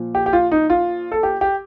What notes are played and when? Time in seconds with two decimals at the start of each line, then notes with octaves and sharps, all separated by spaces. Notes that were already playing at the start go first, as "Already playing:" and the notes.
Already playing: A#2 F3
0.15 G4
0.26 G4
0.33 F4
0.52 D#4
0.70 F4
1.12 A4
1.23 G4
1.41 G4